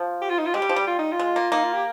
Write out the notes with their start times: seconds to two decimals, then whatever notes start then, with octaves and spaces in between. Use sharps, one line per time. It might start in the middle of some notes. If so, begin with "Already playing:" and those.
Already playing: F3
0.21 G4
0.30 F4
0.38 D#4
0.46 F4
0.54 G#3 G4
0.62 G3
0.69 F3
0.76 G3
0.87 F4
0.99 D#4
1.12 F4
1.19 G#3
1.36 A#3
1.52 A#3 D#4
1.63 F4
1.74 G4